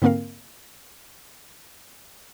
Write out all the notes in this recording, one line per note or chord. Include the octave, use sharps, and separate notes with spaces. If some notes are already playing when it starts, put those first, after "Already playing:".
G#2 D3 A#3 C4 A#4 F5